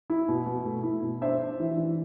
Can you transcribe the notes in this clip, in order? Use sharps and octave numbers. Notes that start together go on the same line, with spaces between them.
E4
B2
B2
A3
E4
B2
D4 C5 E5
D4
E3
E3